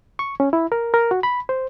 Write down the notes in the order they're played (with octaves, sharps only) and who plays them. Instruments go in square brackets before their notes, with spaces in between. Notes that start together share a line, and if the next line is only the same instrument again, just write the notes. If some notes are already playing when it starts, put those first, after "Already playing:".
[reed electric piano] C#6
C#4
E4
A#4
A#4
F#4
B5
C5